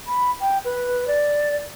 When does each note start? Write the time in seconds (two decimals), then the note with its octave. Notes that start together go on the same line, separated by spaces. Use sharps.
0.07 B5
0.41 G5
0.65 B4
1.07 D5